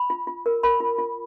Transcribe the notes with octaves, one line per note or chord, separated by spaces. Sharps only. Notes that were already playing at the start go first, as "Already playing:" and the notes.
Already playing: B5
F4
F4
A#4
A#4 B5
F4
F4